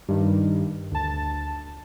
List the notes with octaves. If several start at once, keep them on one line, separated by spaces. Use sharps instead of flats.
G2 D#3
D2 A5